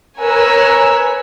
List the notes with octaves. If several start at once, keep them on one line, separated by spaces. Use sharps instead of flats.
A#4 B4 C#5 G#5 E6 F#6